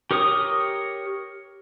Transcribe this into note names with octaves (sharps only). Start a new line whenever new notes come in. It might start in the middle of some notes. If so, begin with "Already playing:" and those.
G4 A#4 C#5 D#6